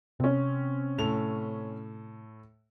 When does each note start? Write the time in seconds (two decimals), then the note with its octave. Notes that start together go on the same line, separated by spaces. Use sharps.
0.20 C3 C4 C#4
0.98 A2 A4 F7